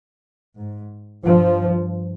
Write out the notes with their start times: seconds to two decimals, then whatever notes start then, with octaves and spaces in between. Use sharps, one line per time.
0.58 G#2
1.25 G2 F3